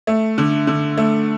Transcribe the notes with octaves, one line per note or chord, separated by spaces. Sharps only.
A3
D3
D3
A3